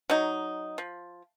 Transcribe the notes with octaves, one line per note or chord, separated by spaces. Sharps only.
F#3 D#4
F3